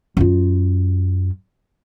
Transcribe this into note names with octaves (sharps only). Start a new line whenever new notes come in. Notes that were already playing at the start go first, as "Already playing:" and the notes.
F#2 F4